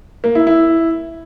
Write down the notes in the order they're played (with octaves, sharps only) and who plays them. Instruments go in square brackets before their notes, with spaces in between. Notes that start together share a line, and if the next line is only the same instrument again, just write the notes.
[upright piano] A#3
E4
E4